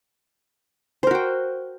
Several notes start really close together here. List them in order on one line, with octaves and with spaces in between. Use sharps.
C5 A#4 F#4 G5